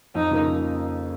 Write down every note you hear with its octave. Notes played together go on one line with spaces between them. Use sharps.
F2 D#4
C#3 F3 A#3